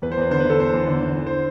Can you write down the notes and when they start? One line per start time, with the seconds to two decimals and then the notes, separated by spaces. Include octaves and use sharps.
0.02 E2 B4
0.12 C5
0.17 E2 B4
0.31 D3 C5
0.40 B4
0.45 D3 A4
0.60 E2 C5
0.74 E2
0.87 D3
1.03 D3
1.16 E3
1.27 C5